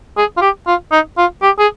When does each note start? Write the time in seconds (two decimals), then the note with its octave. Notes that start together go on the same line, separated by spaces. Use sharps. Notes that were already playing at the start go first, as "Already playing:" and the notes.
0.17 G#4
0.37 F4
0.41 G4
0.67 F4
0.92 D#4
1.18 F4
1.42 G4
1.59 G#4